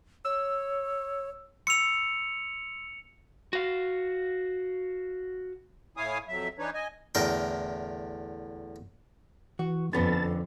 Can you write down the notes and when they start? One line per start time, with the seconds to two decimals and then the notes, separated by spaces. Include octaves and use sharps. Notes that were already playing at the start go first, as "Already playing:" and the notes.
0.25 C#5 E6
1.67 C6 E6 C#7 F7
3.53 F#4 F5
5.97 A2 E4 C#5 F5 G#5 D#6
6.28 F2 F#3 E5
6.59 E3 D4 D#4 B4 C#5
6.74 D#5 G#5
7.15 E2 A2 D3 A#4 G5
9.59 E3 F#4
9.93 F2 D3 B3 C#4 A5 A6